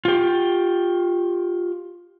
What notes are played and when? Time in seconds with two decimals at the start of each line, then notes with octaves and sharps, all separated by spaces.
0.05 F4 G4